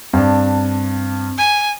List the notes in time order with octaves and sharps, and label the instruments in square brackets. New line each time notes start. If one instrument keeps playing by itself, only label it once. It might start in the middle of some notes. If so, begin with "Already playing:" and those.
[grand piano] G2 D4 [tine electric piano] C4
[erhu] G#5